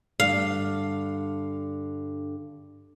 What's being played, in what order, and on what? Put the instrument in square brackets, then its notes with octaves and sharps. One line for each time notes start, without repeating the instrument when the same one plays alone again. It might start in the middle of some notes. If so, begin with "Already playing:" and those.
[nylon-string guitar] G2 D3 [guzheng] F5